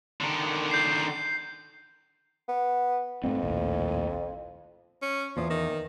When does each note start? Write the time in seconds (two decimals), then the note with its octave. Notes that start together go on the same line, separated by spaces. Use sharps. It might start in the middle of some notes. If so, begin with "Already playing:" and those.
0.21 D3 D#3
0.71 G6 C7
2.48 B3
3.24 F2 G#2 A3 C4
3.42 A#1 D#2 A2
5.02 C#4
5.37 E2 F3
5.50 D#3